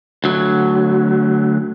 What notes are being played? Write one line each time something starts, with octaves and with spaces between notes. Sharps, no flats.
D2 F#3